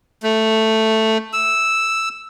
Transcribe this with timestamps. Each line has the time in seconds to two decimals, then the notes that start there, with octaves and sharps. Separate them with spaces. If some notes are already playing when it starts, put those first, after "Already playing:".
0.23 A3
1.33 E6